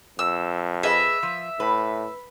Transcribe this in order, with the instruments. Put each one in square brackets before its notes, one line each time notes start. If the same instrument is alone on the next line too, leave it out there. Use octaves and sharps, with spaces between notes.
[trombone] F2 [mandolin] E6
[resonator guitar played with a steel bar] G#4 B4 D#5 [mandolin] E5
[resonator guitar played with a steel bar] F3
[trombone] A2 [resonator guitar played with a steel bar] B4